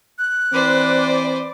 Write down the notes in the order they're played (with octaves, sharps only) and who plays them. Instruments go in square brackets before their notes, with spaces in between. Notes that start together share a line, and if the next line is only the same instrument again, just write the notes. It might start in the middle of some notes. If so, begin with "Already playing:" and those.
[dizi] F#6
[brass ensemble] E3 C4 [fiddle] B4 C5 [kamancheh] D5 D6